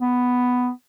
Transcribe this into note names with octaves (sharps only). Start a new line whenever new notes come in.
B3